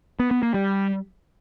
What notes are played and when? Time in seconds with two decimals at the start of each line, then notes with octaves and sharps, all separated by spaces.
0.19 B3
0.31 B3
0.43 A#3
0.54 G3